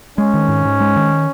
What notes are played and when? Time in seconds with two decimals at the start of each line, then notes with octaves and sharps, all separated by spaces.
0.18 G#3 C#4
0.34 D#3
0.48 G#2
0.65 G#2
0.80 G#3
0.96 D#3